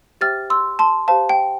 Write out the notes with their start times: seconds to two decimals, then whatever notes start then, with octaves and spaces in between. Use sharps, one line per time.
0.21 G4 C5 E5 G5 F6 A6
0.50 C6 E6
0.79 A5 C6
1.08 G4 C5 F5 A5
1.29 G5